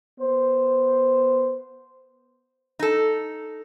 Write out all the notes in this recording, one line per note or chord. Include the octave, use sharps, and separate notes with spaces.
B3 C5
D#4 A4